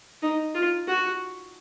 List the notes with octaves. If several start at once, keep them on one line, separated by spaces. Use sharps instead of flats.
D#4
F4
F#4